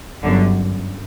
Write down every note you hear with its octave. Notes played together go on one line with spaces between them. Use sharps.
G1 F#2 D3